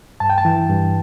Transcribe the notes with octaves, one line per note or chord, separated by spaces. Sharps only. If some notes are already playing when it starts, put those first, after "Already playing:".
G2 A5
G5
A5
E3
G2